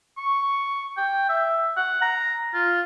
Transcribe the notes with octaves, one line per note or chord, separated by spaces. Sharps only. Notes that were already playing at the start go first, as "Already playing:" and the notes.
C#6
G5
E5
F#5
A#5
F4